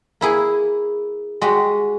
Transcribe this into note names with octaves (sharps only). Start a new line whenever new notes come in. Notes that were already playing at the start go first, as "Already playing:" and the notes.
A#3 E4 G#4
G#3 F#4 G4